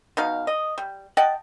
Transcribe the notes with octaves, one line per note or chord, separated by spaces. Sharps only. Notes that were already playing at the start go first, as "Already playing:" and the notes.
B2 D#4 F5
D#5
G3
D#5 F#5 G5 A5